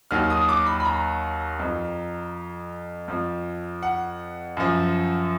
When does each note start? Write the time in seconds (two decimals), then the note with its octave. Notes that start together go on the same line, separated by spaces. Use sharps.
0.11 D#2 D#3 F#3 F6
0.30 D#6
0.49 D6
0.66 B5
0.80 B5
0.85 A#5
1.59 F2 F3
3.08 F2 F3
3.83 F#5
4.57 F#2 F3